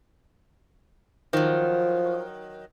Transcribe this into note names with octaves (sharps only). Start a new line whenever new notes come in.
D#3 F3 F#3